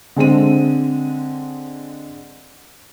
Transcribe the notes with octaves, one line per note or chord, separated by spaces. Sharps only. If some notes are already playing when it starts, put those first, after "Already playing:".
D3 G#3 C4 D#7